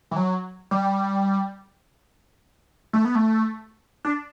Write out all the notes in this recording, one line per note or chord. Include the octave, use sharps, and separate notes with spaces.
E3
F#3
G3
A3
B3
A3
D4